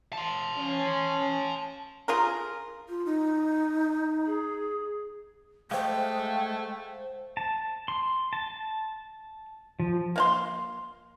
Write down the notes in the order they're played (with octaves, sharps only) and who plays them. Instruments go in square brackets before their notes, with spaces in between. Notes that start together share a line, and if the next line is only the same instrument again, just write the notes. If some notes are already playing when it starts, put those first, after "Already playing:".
[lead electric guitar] A5 C6
[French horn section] C#4
[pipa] F4 G#4 A#4
[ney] F4
D#4
[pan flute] G#4
[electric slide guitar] G#3 [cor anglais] A3 [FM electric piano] C5 F5 [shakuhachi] G5
[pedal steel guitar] A5
C6
A5
F3
[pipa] A#3 F5 C6